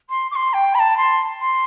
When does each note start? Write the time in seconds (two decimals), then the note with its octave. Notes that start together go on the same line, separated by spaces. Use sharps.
0.09 C6
0.31 D6
0.35 C6
0.53 G5
0.74 B5
0.79 A5
0.97 C6
1.40 C6